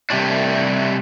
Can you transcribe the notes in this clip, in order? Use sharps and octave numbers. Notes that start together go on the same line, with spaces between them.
C3 G3 A3 D4